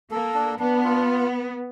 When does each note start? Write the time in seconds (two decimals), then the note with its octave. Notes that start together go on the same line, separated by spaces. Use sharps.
0.11 A#3 A4
0.34 D4
0.59 B3 D4
0.84 F4